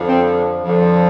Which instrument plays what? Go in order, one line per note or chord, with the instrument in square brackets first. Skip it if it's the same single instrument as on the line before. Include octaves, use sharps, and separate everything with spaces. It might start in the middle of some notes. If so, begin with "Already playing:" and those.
Already playing: [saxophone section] F2 D3 F3
C4
F2 D3 F3